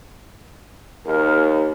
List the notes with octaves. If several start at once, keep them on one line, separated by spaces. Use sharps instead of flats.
D#2 A#4